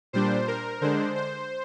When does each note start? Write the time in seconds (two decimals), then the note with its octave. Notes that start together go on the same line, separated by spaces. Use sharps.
0.13 A#2 G3 D4 C5
0.48 A#4
0.81 D3 G#3 D4 C5
1.15 C5